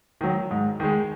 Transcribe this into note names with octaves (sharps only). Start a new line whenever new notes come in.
D#3 F#3
G#2
D#3 G#3